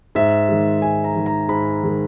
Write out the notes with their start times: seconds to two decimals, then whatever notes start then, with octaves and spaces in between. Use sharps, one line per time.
0.15 G#2 E5
0.49 D#3 G#3
0.82 G#2 G#5
1.04 A#5
1.16 D#3 G#3
1.26 A#5
1.49 G#2 B5
1.83 D#3 G#3